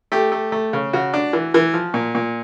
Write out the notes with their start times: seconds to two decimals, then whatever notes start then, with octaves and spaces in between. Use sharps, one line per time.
0.12 A3 G4
0.32 A3
0.52 A3
0.73 C#3
0.93 C#3 F#4
1.14 D4
1.33 E3
1.54 E3
1.74 F3
1.94 A#2
2.15 A#2